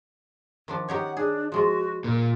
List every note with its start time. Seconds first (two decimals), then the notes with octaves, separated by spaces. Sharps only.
0.68 D#3 F3 D4
0.89 D#4 G4 C#5 F#5
1.17 D4 G#4
1.52 F3 G#3 F4 F#4
2.04 A#2 A#4